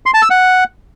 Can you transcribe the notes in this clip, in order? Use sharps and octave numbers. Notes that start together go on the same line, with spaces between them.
C6
A5
E6
F#5